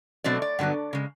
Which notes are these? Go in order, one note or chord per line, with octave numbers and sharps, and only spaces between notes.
B2 F#3 A3 C4 D5
D5
G2 D3 F#3 B3
C#3 G#3